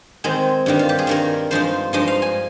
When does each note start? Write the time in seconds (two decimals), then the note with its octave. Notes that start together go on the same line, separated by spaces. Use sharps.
0.24 D#3 G#3 C4 G#4
0.66 G2 D#3 G3
0.79 F4
0.89 G4
0.99 G#4
1.07 G2 D#3 G3 A#4
1.51 G2 F3 G#3 D#4 C5
1.93 G2 F3 G#3 D#4 D#5
2.08 F5
2.22 G#5